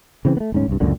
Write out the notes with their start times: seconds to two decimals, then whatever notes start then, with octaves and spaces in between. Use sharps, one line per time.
0.25 C#3 E3 C4
0.37 A3 B3
0.52 D1 G#2 C#4
0.68 C2 G2
0.80 C#2 F#2 A#2 D3